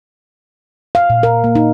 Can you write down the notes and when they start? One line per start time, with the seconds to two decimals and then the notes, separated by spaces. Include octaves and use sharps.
0.95 F5
1.10 A#2
1.23 A#4
1.44 A#3
1.55 D#4